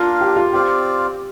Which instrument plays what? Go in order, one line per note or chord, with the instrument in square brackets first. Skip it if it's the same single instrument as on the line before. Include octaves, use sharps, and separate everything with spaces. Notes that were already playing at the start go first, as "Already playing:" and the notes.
Already playing: [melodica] A#3 D4 A#4 F5 [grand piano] F4
[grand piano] G4
F4
[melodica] C4 F4 D5 F5 [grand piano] G4